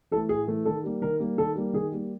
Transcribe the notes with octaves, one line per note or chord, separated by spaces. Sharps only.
E3 A3 A4
A2 G#4
E3 A3
D#3 A4
G3 A#3
D#3 A#4
G3 A#3
D#3 A4
G3 A#3
D#3 G#4
G3 A#3